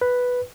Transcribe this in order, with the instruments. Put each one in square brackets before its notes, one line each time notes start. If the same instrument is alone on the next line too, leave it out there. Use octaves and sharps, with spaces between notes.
[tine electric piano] B4